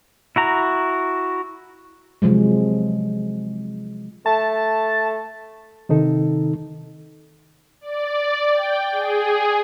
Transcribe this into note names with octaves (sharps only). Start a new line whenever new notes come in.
E4 F#4 A#5
C3 F3 F#3 G#3
A3 A5
C3 D#3 D#4 A4
D5
G5
G#4